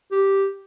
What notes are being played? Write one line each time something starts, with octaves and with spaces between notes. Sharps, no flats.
G4